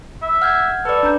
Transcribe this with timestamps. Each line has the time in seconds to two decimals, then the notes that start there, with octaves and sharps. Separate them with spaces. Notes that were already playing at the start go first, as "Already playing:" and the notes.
0.22 E5
0.42 F#5 F6 G6 G#6
0.85 A4 B4 D5
1.03 D4 A#5 G6